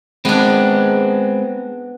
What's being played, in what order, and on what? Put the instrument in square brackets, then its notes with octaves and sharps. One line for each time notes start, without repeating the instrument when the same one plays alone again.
[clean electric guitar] G#3 C4 [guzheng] B3 D4